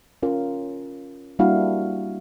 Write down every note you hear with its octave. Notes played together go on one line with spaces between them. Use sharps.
C#4 F4 A#4
G3 A#3 D4 E4 F#4 F5